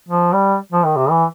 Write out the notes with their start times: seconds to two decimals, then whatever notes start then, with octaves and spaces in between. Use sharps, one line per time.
0.09 F3
0.34 G3
0.72 F3
0.85 D#3
0.97 C3
1.10 E3